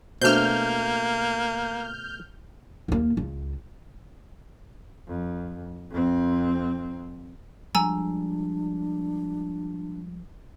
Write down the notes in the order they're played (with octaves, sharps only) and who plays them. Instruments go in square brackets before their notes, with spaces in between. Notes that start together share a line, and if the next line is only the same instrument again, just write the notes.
[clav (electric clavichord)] B2 A3 [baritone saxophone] A#3 [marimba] D4 F#4 C5 [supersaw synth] F6 G6
[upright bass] D#2 A#3
C#2
[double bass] F2
F2 C4
[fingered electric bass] F3 G3 G#3 [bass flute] D4 [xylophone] G#5 A#5 E6